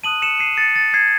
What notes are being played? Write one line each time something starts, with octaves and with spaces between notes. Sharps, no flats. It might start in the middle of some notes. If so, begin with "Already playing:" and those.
A5 D#6 F#6 D#7 F#7
C#7 E7
C7 D#7
A6 C#7
A6
G#6 C7